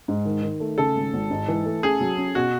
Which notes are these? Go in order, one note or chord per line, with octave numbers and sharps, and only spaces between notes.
G#2
D#3
D#3
A3
C#3 A4
G#1
G#1
G#2
E3
A3
C#4 G#4
F#3
C#4
B2 F#4